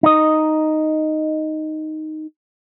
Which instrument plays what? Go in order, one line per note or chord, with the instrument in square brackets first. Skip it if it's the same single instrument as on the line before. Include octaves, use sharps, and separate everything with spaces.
[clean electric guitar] D#4 D#5